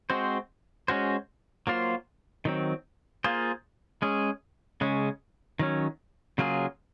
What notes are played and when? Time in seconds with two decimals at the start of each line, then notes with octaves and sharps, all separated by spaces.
0.10 G#3 C4 F#4 C5
0.88 G#3 C#4 F#4 C5
1.67 F#3 A#3 F4 C5
2.45 D#3 F#3 C4
3.24 A#3 F4 G#4 C5
4.02 G#3 C#4 G#4
4.81 C#3 G#3 C#4
5.59 D#3 F#3 C#4
6.38 C#3 F#3 A#3 F4 G#4